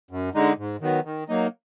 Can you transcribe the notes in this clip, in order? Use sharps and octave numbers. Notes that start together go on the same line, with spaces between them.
F#2
D3 G#3 D#4
G#2
D#3 F#3 B3
D#3
F#3 A#3 D#4